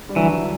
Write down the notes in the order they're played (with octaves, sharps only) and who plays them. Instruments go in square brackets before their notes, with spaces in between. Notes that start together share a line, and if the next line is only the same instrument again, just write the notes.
[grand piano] G3
[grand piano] D3 F#3 [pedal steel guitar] E3